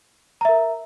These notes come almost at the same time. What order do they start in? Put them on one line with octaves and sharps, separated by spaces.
A#5 E5 A#4